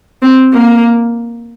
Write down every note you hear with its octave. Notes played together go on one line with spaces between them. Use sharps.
C4
A#3